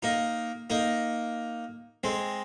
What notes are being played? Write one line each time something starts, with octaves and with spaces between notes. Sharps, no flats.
A#3 D#4
A#3 D#4
G#3 C4